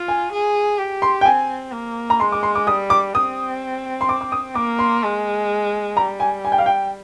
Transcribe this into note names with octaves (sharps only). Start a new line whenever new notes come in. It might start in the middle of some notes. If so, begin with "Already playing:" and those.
Already playing: F4
G#5
G#4
G4
C6
G5
C4 G#5
A#3
A#5
G#3 C6
D6
C6
D6
G3 D#6
D6
C4 D#6
C6
D6
D6
D#6
A#3 D6
C6
G#3
G3 A#5
G#5
G#5
G5
F5
G5